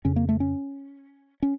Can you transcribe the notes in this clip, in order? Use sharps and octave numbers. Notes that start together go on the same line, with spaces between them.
F2 C#3 C#4
A#3
A3
C#4
C#4